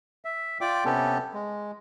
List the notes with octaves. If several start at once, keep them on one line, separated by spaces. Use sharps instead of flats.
E5
F4 D5 G5 D6
C3 B3 C#4 G4 A4
G#3